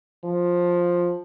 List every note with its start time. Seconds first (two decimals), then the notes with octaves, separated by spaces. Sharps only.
0.24 F3